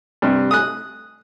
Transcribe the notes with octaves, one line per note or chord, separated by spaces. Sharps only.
G2 C3
D#6 F#6